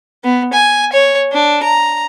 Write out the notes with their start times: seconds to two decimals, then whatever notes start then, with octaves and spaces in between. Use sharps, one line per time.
0.24 B3
0.53 G#5
0.93 C#5
1.33 D4
1.64 A#5